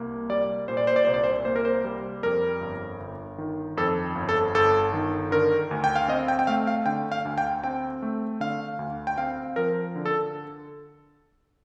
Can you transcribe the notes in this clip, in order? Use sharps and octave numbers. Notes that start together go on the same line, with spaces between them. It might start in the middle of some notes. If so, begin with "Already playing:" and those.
Already playing: C2 A#3
G3 D5
A#2 C5
D5
C5
D5
C2 C5
D5
C5
A#3 C5
A#4
C5
G3
F2 A#4
G1
G1
D#3
F2 A4
G1
A4
G1 A4
D#3
D3 A#4
D2
G5
F5
C4 D#5
G5
G5
A3 F5
F5
D3 G5
F5
D2
G5
C4 G5
A3
D3 F5
D2
G5
C4 F5
F3 A#4
D3
A4